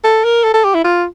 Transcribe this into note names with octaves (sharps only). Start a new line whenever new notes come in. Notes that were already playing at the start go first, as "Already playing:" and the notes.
A4
A#4
A4
A4
G4
E4
F4